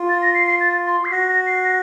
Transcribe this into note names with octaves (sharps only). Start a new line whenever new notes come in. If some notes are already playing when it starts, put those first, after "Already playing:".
Already playing: F4
A6
A#6
C7
C7
A6
C6
C7
F#4 A#6
A#6
C7
A#6